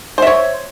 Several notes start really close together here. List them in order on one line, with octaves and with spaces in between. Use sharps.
C5 E5 C#5